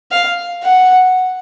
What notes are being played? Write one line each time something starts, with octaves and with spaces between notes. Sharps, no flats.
F5
F#5